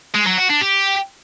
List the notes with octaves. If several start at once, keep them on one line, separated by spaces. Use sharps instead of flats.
G#3
F#3
F#4
D4
G4